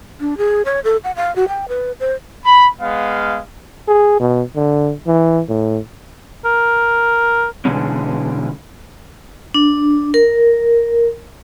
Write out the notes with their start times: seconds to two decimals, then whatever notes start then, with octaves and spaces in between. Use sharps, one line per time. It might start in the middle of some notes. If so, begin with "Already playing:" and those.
0.20 D4
0.37 G#4
0.65 C#5
0.84 A4
1.04 F#5
1.16 F5
1.36 F#4
1.48 G5
1.68 B4
2.00 C5
2.45 B5
2.80 G#3 B3 F5
3.88 G#4
4.20 B2
4.56 D3
5.07 E3
5.49 A2
6.45 A#4
7.65 B2 D3 E3 G#3 C#4
9.54 D4
10.14 A#4